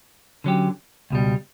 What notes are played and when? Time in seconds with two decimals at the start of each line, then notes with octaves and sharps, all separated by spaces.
0.44 D3 F#3 C#4 G4
1.10 C#2 B2 G3